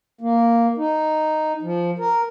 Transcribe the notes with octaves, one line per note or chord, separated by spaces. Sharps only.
A#3
D#4
F3
A#4